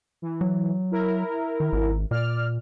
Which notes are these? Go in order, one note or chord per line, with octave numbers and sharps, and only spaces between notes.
E3
F#3
E4 A#4
D#3
G#1
A#2 D5 F6